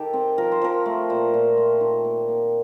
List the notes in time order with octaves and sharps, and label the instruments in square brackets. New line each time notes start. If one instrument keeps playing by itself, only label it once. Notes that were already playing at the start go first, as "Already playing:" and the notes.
Already playing: [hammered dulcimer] D#3 G4 A4
C4
F3 A#4
C5
F3 A#4
A3
A#2 C5
A#2
A3
D#3
A#3
A#3